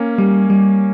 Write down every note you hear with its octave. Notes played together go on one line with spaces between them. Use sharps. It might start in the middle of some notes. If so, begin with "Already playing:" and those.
Already playing: A#3 C#4
G3
G3